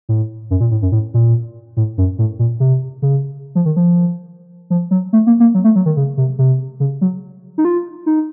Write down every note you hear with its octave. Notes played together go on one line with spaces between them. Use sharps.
A2
F#2
A#2
A2
F#2
A2
A#2
A2
F#2
A2
A#2
C3
C#3
F3
D#3
F3
F3
F#3
A3
A#3
A#3
F#3
A3
F#3
D#3
C#3
C3
C3
C#3
F#3
D#4
F4
D#4